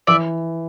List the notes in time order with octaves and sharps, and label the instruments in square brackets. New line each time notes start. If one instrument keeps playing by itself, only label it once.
[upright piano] E3 [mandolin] D5 E5